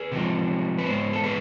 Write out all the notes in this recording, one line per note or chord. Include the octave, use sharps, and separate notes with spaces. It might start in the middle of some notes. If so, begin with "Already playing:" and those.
Already playing: G#4 B4
C3 F3 G#3
B4
G#2 G#3 B3 C5
A4
G#4 B4